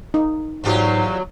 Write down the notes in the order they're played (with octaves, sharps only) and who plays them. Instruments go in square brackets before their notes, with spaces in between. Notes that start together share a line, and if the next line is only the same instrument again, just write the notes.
[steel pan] D#4
[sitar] E2 F4 G4 [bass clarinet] G#2 [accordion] F#3